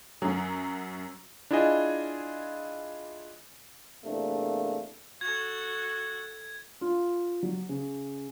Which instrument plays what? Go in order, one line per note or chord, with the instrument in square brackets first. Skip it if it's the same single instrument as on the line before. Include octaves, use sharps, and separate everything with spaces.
[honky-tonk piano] F#2 F#3
[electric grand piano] D4 E4 F4 G#4 D#5 G#5
[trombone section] E2 C3 A3 A#3 D4
[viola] F#4 A4 [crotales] G#6
[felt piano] F4
F#3
C#3